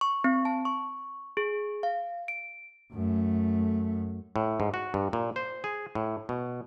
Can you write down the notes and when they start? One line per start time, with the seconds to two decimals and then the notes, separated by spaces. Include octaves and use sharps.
0.01 C#6
0.24 C4
0.45 A5
0.65 C#6
1.37 G#4
1.83 F5
2.28 D7
2.93 F#2 A3
4.36 A2
4.60 G#2
4.74 F#4
4.94 G2
5.13 A#2
5.36 C5
5.64 G#4
5.95 A2
6.29 B2